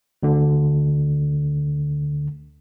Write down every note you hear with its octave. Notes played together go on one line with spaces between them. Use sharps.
D2 D3